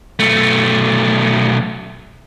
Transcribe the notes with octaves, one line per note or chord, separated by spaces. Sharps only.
B1 A3